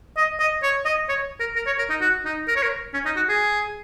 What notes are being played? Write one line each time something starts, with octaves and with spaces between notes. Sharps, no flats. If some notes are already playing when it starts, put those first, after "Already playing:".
D#5
D#5
C#5
D#5
C#5
A#4
A#4
C#5
A#4
D#4
F#4
D#4
A#4
C#5
A#4
C#4
D#4
F#4
G#4